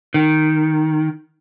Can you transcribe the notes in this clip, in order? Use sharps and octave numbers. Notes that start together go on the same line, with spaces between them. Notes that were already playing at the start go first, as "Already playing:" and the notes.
D#3